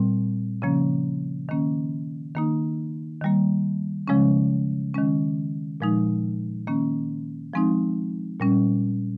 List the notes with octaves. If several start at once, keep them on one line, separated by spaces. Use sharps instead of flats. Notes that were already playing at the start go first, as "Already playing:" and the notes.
Already playing: A#2 G3 C4
C#3 F3 A#3 C#4
D#3 A#3 C#4
D#3 A#3 D#4
D#3 G3 A#3
C#3 F3 G#3 C#4
D#3 G#3 C#4
A#2 F3 G#3 D#4
D#3 A#3 C#4
F3 G#3 C4 D#4
A#2 G3 C#4